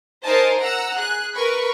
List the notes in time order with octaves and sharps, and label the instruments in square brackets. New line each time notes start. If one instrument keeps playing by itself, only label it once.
[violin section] D#4 A#4 C5 D#5 G#5 A5
F#5 A#5 E6
G#4 F#6
A#4 B4 B5 C#6